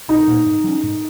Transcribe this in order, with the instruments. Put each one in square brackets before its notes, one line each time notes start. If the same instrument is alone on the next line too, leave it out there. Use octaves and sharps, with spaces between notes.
[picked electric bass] A#1 [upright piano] D#4
[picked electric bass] A#2 A#3
G#2
F#3 C#4
G#2